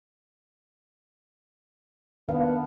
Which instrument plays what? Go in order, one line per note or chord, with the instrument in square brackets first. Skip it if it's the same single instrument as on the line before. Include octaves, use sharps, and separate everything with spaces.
[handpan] D#3 D4 [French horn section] B3 [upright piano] F5